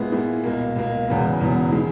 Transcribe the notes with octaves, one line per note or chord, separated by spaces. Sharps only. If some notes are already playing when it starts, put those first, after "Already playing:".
Already playing: A#2 G#3 B3 E4
A#2 G#3 B3 E4
C#2 B2 A#3
C#2 B2 A#3
E1 E2 C#3 E3 B3
E1 E2 C#3 E3 B3
D#3 G#3